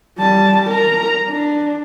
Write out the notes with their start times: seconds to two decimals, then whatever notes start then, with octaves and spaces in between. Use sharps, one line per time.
0.18 G3 A5
0.69 A#4 A#5
1.28 D4